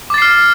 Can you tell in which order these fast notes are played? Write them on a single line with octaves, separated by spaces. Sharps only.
D6 A6 C7 F6